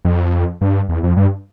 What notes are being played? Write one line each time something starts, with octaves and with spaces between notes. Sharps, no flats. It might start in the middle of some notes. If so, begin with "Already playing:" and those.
F2
G2
E2
F2
G2